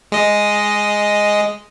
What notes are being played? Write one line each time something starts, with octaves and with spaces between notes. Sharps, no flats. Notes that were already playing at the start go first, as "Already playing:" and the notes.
G#3 D#5